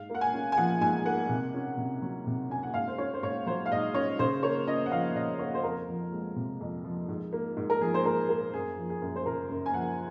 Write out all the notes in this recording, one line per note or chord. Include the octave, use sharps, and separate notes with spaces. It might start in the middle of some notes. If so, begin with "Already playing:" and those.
Already playing: G#2 F5
A#3 F#5
G#5
C#4
G#5
F3 F#5
G#2 G#5
A#3 F#5
C3
C#4
C3
F#3
C3
C#4 G#5
F#5
G#2 F5
C5
C#4 C#5
C5
G#2 C#5
F#3 C5
F5
G#2 D#5
C#4 C#5
C#3 C5
A#3 C#5
C#4 D#5
F#5
F3 F5
C#3 D#5
A#3 C#5
C5
F2 A#4
F3
G#3
C3
F2
F3
G#2
A#3
G#2
A#4
F3 G#4
C5
G#2 A#4
A#3 A#4
F#2 G#4
F3
G#4
F#2
C5
C#3 A#4
F#2
G#5
F3 F#5